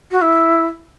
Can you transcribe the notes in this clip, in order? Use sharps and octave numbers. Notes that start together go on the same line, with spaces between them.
F#4
E4